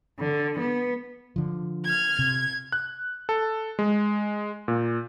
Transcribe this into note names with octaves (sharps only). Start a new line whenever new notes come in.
D3
B3
D3 F3
F6 G#6
C3 G#6
F#6
A4
G#3
A#2